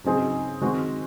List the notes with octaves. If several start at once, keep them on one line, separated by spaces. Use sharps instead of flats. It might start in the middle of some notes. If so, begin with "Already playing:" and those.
C#3 F#3 C4 D#4 G#4
D#3 G#3 C4 F#4